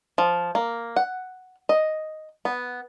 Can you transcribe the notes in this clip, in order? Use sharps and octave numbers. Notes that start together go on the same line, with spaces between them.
F3
A#3
F#5
D#5
B3